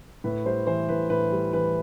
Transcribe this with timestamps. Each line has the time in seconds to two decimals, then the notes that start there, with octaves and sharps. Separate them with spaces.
0.24 A2 B4
0.46 G3 C5
0.67 E3 C5
0.89 A2 B4
1.10 A2 B4
1.32 G3
1.53 E3 B4